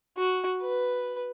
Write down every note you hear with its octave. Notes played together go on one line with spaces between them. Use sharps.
F#4
B4